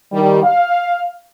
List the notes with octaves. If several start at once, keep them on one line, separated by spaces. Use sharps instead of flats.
D#3 G3
F5